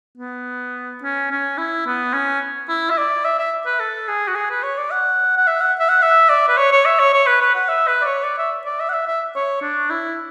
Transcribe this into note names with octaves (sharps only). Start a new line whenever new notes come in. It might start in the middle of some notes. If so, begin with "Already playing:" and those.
B3
C#4
C#4
E4
B3
C#4
E4
E5
D5
E5
E5
B4
A4
G#4
F#4
G#4
B4
C#5
D5
F#5
F#5
E5
F#5
E5
F#5
E5
D5
B4
C#5
C#5
E5
C#5
C#5
B4
B4
F#5
E5
B4
D5
C#5
D5
E5
D5
E5
F#5
E5
E5
C#5
D4
E4